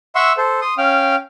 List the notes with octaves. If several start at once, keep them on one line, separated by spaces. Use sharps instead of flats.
E5 F#5 C6 C#6 E6
A4 C5
C6 D#6
C#4 F5 G5 F6